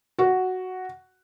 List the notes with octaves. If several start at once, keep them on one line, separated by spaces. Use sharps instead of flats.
F#4